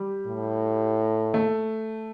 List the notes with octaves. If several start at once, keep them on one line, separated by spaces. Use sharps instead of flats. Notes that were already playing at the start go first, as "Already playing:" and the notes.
Already playing: G3
A2
A3